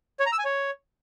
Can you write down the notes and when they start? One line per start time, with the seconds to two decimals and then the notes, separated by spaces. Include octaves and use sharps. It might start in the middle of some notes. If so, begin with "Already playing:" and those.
0.20 C#5
0.26 A#5
0.32 E6
0.39 G#5
0.45 C#5